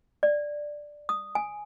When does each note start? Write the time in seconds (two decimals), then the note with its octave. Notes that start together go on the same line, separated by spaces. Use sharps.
0.23 D5
1.09 D#6
1.35 G#5